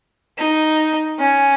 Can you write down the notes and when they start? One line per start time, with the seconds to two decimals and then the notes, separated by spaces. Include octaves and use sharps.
0.38 D#4
1.19 C#4